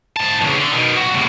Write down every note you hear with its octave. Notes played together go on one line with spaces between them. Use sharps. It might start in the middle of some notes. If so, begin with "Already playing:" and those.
G#2 A5
E2 C#3
D3
B2 D#3
B1 F#4
A2 C3